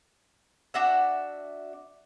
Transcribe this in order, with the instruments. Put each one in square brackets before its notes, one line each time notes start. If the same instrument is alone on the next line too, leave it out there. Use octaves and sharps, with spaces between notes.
[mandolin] D4 F#4 E5